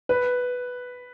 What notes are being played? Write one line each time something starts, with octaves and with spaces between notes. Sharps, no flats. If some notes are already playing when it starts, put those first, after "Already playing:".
B4